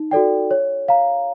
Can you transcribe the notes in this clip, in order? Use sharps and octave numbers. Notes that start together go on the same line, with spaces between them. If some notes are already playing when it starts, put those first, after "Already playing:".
Already playing: D#4
F#4 A4 D5 G5
C#5
F5 A#5